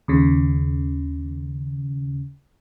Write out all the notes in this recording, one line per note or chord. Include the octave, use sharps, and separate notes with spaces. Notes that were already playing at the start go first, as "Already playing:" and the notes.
D#2 C#3